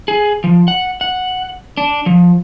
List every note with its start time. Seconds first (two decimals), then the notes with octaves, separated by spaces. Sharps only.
0.08 G#4
0.44 F3
0.68 F#5
1.01 F#5
1.77 D4
2.06 F3